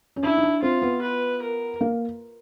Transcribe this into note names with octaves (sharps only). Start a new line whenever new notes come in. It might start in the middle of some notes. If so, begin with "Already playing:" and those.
C#4
D4 E4
D#4
D4
C4 F4
B3
B4
A#4
A#3